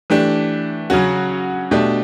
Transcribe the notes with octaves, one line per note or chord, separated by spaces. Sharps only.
E3 A3 D4 G4
C#3 F#3 C#4 F#4
B2 A3 D4 G4